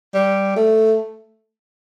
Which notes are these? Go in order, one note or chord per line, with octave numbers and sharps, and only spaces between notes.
G3
A3